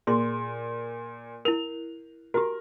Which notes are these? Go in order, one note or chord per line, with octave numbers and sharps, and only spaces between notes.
A#2 G#4 C6
E4 A#4 F7
F#4 G4 A#4